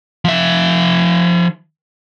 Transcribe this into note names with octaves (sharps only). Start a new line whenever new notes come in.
F3 E5